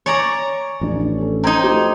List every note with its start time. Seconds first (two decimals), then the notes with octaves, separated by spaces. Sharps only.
0.06 C#5 D5 G#5 A#5 C#6
0.81 A1 F3 D4
1.18 C#4 A4
1.44 C4 D#4 A#5 G6 G#6
1.64 F3 A3 G4